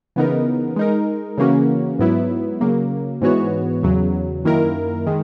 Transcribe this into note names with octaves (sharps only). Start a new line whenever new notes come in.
C#3 E3 B3 D#4 A#4
G#3 D#4 A#4
C#3 E3 A#3 C#4 F#4
G#2 F#3 B3 E4
C#3 F#3 A#3
G#2 E3 B3 F#4 C#5
E2 C#3 F#3
F#2 D#3 A#3 E4 A#4
D#3 G#3